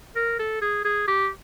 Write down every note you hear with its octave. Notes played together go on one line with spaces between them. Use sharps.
A#4
A4
G#4
G#4
G4